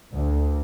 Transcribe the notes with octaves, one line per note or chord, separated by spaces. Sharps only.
D2